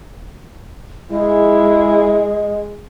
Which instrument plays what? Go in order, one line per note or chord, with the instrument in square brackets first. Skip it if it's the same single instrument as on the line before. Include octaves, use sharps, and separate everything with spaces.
[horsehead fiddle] G#3 G#4 [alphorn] E4 [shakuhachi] D#5